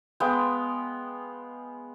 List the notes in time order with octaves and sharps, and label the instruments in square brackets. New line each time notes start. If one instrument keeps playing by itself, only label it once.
[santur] G#3 B3 F5 G5